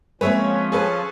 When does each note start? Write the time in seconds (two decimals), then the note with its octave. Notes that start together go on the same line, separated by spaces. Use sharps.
0.21 F3 G#3 A#3 C4 C#4 B4 C#5 E5
0.72 G#4 A4 B4